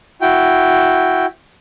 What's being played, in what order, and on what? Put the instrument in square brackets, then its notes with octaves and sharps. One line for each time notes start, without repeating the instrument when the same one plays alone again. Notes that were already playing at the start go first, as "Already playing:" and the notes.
[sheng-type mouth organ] E4 F#4 G5